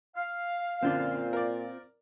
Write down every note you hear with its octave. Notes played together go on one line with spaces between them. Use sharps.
F5
F#2 A#2 D3 C4 D4 F4
A#4 D5